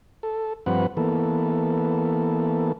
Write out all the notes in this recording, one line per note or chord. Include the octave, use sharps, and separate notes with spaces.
A4
G2 F3 C4 B4 F#5
E3 A#3 B3 A4